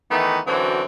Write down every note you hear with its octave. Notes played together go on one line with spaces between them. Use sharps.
D#3 E3 A3 B3 D#4
F#2 D3 E3 C4 F#4